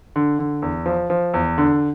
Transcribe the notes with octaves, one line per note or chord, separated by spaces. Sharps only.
D3
D3
E2
F3
F3
E2
D3